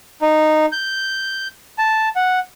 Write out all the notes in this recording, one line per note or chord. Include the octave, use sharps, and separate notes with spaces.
D#4
G6
A5
F#5